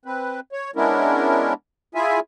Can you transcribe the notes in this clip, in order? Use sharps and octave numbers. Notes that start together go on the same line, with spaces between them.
C4 B4
C#5
G#3 B3 C#4 D4 E4 A#4
E4 F4 G#4 E5 G#5